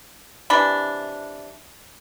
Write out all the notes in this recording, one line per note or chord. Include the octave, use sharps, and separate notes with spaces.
C3 E3 D4 B5